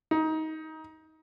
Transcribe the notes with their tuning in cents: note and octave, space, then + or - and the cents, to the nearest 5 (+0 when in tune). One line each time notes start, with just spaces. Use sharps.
D#4 +20